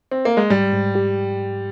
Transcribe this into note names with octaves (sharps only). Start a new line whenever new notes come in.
C4
A#3
G#3
G#2 G3
G#2
G4